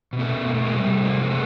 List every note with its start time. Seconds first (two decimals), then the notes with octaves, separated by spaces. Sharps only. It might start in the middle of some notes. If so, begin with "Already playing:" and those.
0.13 B2
0.19 A3 B3
0.33 B2
0.47 A#3
0.54 B2 A3
0.64 G#3 A#3
0.75 C3 G3 A3
0.96 C3
1.02 G#3 A#3
1.16 F3 A#3
1.30 A3 B3